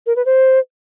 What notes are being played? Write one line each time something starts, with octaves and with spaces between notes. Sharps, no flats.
A#4
B4
C5